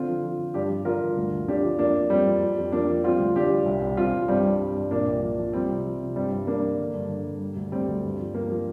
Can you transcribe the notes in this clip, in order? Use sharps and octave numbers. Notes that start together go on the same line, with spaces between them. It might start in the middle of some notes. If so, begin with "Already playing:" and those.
Already playing: D3 C4 F4
F3
F3
D3
G2 D4 G4
F3
D3 F4 A#4
G2
D2
D2
D2 D4 G4
F3
F2 A#3 D4
F2
F2 G3 C4
F2
F2
F2
F3 A#3 D4
F3
G3 C4 F4
D2
D2 D4 G4
G3
C2
C2
C2 C4 F4
C2
G2 G3 C4
G2
G3
G2
A#2 A#3 D4
C2
F3
F3
F3 G3 C4
C3
F3
C3
G2 G3 C4
G2
G2 A#3 D4
G3
D3
G2
D3
G2
G3
D2
D2 G3 C4
D2
G2
F3
G2 A#3
F3